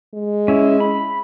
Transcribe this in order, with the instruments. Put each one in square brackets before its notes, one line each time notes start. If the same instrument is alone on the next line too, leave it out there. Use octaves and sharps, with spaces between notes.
[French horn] G#3
[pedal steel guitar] C#4 E4
B5